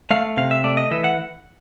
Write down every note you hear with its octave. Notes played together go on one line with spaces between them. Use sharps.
A3 F5
C3 F5
E5
A3 D5
D#5
E3 E5
F#5